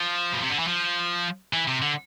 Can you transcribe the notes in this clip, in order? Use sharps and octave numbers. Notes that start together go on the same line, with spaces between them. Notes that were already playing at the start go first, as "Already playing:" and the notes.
Already playing: F3
B2
C3
D3
E3
F3
E3
C3
D3